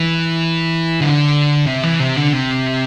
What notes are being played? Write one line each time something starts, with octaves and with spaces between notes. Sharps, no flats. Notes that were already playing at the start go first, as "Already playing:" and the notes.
Already playing: E3
D3
C3
E3
C3
D3
C3